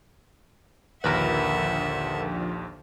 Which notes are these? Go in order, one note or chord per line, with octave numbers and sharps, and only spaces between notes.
A#1 D#2 D3 F3 A#4 B4 E5 F#5